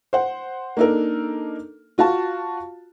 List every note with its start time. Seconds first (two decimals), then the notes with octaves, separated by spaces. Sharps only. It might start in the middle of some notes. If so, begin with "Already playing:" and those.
0.13 C5 F#5
0.77 A#3 D4 D#4 A4 A#4
1.98 F4 F#4 F5 A5